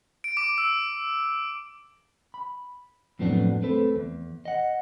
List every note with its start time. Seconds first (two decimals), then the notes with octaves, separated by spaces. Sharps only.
0.24 D7
0.37 D6
0.58 E6
2.34 B5
3.19 F2 A2 F#3 B3 C#4 D4
3.62 A3 C4 A4 B4
3.96 E2
4.45 D#5 F#5